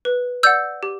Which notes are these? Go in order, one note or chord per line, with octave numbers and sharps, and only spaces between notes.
B4
D5 F#5 E6 G6
G4